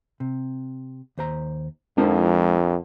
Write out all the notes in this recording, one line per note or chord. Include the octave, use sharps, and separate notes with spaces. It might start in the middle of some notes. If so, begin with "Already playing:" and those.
C3
D#2 C5 A#5
F2 D3 F3 G#3 A#3 D#4 E4